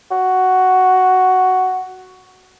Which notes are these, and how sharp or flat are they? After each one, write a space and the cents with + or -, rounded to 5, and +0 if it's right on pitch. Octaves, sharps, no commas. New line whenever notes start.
F#4 +5